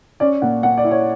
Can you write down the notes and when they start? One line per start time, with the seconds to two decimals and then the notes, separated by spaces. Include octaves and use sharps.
0.20 C#4 D5
0.42 A#2 F#5
0.63 A#2 F#5
0.78 D5
0.84 E4
0.91 C#5